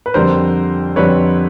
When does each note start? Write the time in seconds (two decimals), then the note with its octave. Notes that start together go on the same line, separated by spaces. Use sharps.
0.06 B4
0.14 F2 D3 G3 A#4 C5
0.96 F2 D3 G3 B4 C#5